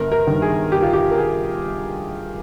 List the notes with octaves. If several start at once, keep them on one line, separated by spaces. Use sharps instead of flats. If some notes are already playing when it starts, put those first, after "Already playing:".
Already playing: G1 A#4
A#4
G2 D#3
G#4
G1 G4
F4
G4
A#4
G#4